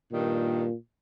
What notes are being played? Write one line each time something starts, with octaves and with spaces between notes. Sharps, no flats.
G2 A#2 D#3 G3